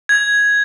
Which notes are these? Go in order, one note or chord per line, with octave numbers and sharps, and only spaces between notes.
G#6